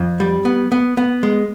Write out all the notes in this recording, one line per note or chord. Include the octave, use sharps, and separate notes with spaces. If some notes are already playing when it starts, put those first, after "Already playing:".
Already playing: F2
G3
B3
B3
B3
G#3